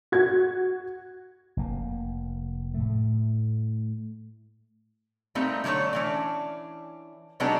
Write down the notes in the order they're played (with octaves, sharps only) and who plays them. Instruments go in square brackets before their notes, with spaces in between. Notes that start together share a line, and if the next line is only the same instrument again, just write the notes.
[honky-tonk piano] F#4 G#6
[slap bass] F1 A#3
A2 A3
[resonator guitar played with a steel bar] G3 A3 A#3 C4 D#4
D3 F#3 G#3 A3 C#5
E3 C#4 D4
C3 F#3 G#3 B3 D4 D#4